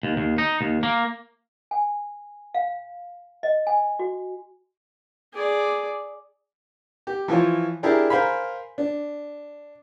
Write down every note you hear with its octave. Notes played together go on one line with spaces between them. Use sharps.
D#2
D#2
D#4
D#2
A#3
G#5
F5
D#5
G#5
F#4
G#4 D5
G4
E3 F3 F4 C#5
D4 E4 G4 G#4 A#4 D5
A#4 C5 F5 G#5 B5
D4